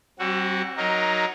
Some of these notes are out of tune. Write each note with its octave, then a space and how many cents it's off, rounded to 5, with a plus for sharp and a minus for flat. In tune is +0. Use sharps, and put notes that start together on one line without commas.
G3 -45 C4 +35 F#4 +0
F#3 +0 D#4 +0 A#4 +15